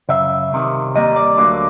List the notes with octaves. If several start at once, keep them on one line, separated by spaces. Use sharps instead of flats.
F#2 C#3 E5
C2 C3 D#3
D#2 D#3 G3 A#3 D#5
D5
D2 D3 F#3 A#3